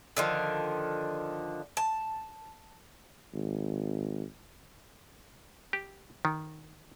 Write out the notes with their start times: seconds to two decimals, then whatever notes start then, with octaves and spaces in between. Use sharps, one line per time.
0.17 D3 D#3 F3
1.77 A5
3.33 G#1
5.73 G4
6.25 D#3